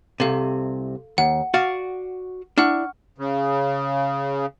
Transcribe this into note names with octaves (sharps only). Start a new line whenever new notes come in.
C2 C3 A4 F5
D#2 F#5
F#4 D5 F5
D4 E4 F#5 C#6 F6
C#3